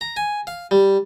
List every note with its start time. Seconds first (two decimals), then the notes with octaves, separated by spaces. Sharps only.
0.01 A#5
0.17 G#5
0.47 F5
0.71 G3